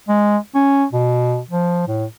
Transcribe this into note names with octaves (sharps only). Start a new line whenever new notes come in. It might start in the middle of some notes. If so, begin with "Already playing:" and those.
G#3
C#4
B2
F3
A2